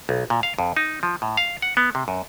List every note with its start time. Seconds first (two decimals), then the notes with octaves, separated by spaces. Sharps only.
0.09 B1
0.30 A#2
0.43 F5
0.59 F2
0.77 D#4
1.03 F3
1.22 A2
1.37 F5
1.62 F#5
1.77 B3
1.95 C3
2.08 F#2